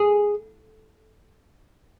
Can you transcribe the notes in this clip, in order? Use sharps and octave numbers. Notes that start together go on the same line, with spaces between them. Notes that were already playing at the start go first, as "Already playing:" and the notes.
Already playing: G#4